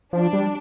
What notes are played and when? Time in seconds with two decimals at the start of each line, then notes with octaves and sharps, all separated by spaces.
0.13 F3 D4
0.33 G3